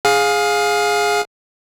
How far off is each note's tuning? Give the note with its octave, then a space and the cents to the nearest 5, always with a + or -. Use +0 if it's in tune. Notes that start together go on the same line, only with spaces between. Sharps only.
G#4 +0 F5 +20